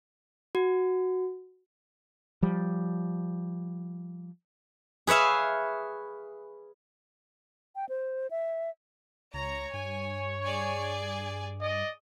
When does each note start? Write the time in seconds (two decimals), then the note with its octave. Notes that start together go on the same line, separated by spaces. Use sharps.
0.55 F#4
2.42 F3 G3
5.07 G#4 B4 C#5 E5 F5
7.76 G5
7.89 C5
8.31 E5
9.34 C#2 C#5 A#5
9.74 G2 G#5
10.44 G#4 D5 G#5
11.59 D5 D#5